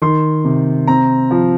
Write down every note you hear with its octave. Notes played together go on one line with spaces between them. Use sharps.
D#3 C6
C3
C4 A#5
F3